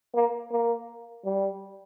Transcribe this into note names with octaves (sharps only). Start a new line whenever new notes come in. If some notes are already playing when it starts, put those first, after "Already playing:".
A#3
A#3
G3